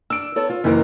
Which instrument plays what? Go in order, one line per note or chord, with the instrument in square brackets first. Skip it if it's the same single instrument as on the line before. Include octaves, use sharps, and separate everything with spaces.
[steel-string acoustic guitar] D4 [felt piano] E6 D7
[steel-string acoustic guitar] B3 A4 C#5
F4
[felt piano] F#1 E3 [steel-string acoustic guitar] D#3 A#3 A#4